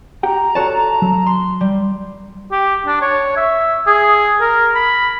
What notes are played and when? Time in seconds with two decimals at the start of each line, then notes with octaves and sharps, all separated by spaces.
0.23 G4 F#5 G5 A#5
0.55 F#4 A4 C#5 D5 A5
1.02 F#3
1.26 C6
1.61 G3
2.52 G4
2.86 D4
3.02 C#5
3.37 E5
3.87 G#4
4.41 A#4
4.75 B5